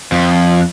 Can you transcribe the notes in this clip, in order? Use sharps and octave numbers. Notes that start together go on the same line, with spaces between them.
F2